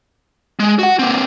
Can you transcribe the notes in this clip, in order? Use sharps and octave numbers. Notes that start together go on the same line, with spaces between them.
G#3
F#4 F#5
A#3 C4